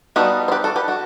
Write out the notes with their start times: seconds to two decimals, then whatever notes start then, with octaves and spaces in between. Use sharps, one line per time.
0.16 G3 B3 D#4 F#4 A4
0.48 C5
0.52 G4 B4
0.64 F#4 A4
0.76 G4 B4
0.88 F#4 A4